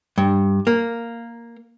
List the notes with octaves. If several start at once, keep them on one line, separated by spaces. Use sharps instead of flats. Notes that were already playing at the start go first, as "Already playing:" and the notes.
G2
A#3